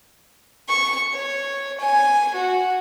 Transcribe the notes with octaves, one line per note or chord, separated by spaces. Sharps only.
C#6
C#5
G#5
F#4